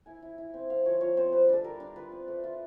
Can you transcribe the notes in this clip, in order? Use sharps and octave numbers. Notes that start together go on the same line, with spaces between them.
E4 G#5
E4
E4
C4
C4 F5
F3 C#5
F3 C#5
C4 C5
G3 B4
D4 A4
G3 A#4
D4
F4 B4
C4
A3
F4